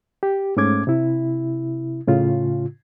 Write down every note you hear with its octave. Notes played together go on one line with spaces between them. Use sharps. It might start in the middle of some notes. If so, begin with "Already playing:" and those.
G4
G#2 A3 C#4 D6 G#6
C3 E4
A2 C#3 F4